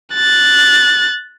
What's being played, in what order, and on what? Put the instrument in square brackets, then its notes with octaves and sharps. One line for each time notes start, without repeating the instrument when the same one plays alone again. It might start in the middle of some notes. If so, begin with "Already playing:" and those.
[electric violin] F#6 A6